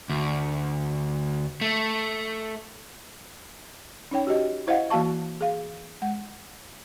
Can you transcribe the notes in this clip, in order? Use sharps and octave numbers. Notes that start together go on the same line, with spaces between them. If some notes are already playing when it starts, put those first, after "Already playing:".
D2
A3
C#4 D#4 C#5 G5
F#4 G4 D#5
E4 C5 D#5 F5 F#5
E3 A#3 F#4 F5 A5 C#6
G#4 F5
G#3 F#5